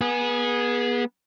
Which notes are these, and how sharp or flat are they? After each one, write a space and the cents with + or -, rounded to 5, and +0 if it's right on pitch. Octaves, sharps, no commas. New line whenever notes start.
B3 -30 G#4 +0